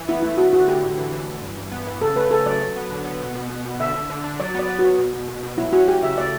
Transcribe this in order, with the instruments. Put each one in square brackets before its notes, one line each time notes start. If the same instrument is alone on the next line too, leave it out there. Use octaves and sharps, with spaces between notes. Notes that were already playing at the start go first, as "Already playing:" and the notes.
Already playing: [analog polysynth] E3
[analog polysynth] B3 [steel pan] E4
[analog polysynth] A3 [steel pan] E4
[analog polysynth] D3 [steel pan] F#4
[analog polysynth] D3 [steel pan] F#4
[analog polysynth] D3 [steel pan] G4
[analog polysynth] A2
E3
E3
E3
G2
G2
B3
E3
[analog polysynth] C#3 [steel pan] A4
[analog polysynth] A3 [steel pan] B4
[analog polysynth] C#4 [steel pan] A4
[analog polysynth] F#3 [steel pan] D5
[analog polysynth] F#3
B3
D3
B3
B2
B2
B2
B2
[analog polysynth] D3 [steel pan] E5
[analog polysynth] D3
D3
D4
[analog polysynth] F#3 [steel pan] D5
[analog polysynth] B3 [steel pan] D5
[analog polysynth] B3
[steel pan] F#4
[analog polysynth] F#3
B2
B2
B2
B2
[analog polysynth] F#3 [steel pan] E4
[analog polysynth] C#4 [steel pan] F#4
[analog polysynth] C#4 [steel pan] G4
[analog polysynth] C#3 [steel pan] E5
[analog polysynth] A3 [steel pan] D5